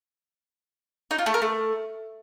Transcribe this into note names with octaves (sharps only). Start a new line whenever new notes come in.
D#4
F4
A3
A#4
A3